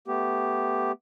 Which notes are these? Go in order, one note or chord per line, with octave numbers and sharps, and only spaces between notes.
A3 B3 G4